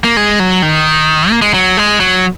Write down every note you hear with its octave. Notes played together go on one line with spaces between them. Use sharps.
A#3
G#3
F#3
D#3
A#3
G#3
F#3
G#3
F#3